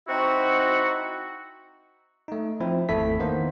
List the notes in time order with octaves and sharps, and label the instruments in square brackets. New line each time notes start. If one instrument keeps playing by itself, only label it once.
[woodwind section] C4 D#4 E4 F#4
[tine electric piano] A3 D#4
F3 C4 E4
G#1 E2 A3 E4 A4 B6
D#3 E3 A#3 B3 D#4 C5